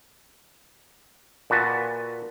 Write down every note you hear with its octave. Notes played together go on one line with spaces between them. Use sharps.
A#2 F#4 B4 A5